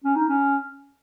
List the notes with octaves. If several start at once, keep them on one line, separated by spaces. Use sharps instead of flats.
C#4
D#4
C#4